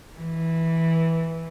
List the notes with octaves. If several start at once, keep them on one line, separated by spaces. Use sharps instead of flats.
E3